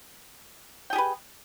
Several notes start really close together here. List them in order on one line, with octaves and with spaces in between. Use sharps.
G5 G#4 G4 B4